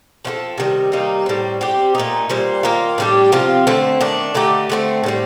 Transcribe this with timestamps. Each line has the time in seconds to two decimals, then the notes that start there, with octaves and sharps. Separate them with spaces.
0.25 F3 C4 F4 A4
0.58 C3 D#3 G3
0.92 C3 G3 A#3 D#4
1.26 A2 G3 C4
1.61 G3 C4 G4
1.95 A#2 A3 D#4
2.30 A#2 G3 C4
2.63 D#3 A#3 F4
2.98 A2 G3 D4 G4
3.32 C3 F3 C4 F4
3.67 D3 A3 C4
4.01 D#3 A3 D4
4.34 D3 A3 D#4 G4
4.70 D3 A3 C4
5.04 A2 G3 C4